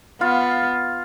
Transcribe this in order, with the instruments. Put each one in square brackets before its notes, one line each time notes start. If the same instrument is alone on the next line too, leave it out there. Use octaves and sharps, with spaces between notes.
[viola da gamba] B3 [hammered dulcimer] F4 F5